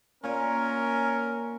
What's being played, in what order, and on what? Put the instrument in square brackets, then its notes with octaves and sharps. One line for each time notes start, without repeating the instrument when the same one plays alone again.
[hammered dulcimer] A#2 [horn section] C#4 A#4